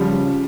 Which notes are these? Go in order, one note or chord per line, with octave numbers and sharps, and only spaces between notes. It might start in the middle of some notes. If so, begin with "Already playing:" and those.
Already playing: C#3 F3 G3